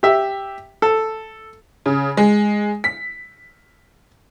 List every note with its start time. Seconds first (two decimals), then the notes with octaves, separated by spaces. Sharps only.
0.03 G4 E5
0.82 A4
1.86 C#3
2.17 G#3
2.84 B6